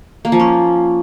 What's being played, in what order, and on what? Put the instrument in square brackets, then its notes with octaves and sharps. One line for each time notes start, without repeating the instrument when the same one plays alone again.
[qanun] A#3
F3
C#4